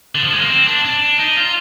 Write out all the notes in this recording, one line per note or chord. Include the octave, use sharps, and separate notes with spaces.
D3
F3
G#3
A#3
C4
D4
D4
D#4
F4